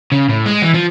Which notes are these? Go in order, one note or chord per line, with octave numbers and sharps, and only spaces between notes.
C#3
A2
G#3
E3
F3